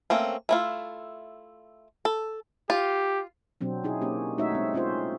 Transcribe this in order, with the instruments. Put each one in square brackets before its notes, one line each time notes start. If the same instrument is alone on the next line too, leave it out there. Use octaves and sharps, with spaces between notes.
[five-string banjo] A3 A#3 C4 C#4
A3 E4 F4
A4
[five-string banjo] F4 [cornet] G4
[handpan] B2 F#3 C4 D4
D#4 E4 G#4
A#3 C#4 G4
A3 D#4 F#4 C#5 E5
G#3 C4
C4 C#4 F4 G#4 C5